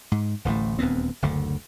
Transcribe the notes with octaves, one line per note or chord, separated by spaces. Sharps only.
G#2
D1 A1 A2 A3
D#1 D2 B3 C4
F#1 D2 D3